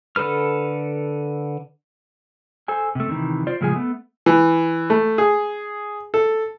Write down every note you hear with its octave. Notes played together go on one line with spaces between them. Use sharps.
D3 A4 B4 F6
A4 C5 G#5
C3 A3
C3 D#3 E3
F4 C5 D5
A2 C#3 F3 G#3 G#4 G#5
A3 B3
E3
A3
G#4
A4